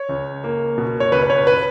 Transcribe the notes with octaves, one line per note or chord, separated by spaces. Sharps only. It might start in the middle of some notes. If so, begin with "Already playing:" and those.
Already playing: C#5
C#2
A#3
B2
C#5
C#2 B4
B4
C#5
B4